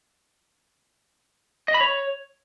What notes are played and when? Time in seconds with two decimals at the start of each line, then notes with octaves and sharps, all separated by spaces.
1.68 D#5
1.74 B5
1.80 C#5